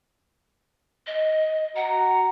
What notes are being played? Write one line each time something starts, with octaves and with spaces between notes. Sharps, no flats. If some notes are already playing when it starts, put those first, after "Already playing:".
D#5
F#4 F#5 A#5